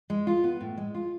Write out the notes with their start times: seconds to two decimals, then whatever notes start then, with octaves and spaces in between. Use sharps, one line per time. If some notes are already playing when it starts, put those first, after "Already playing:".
0.10 G#3
0.27 F4
0.44 B3
0.61 A2
0.78 G#3
0.94 F4